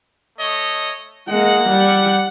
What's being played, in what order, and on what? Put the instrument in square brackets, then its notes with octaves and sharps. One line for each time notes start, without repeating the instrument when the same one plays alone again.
[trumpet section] A3 C#5 D#5
[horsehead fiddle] G#3 A#3 [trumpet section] F#5
[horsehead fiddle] G3